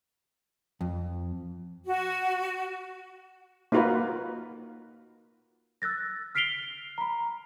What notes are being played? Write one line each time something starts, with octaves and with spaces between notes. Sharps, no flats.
F2
F#4
A#3 D#4 F4 F#4 A#4 B4
E6 F#6 A6 A#6
F6 B6 C7 D7 F7 G7
A#5 B5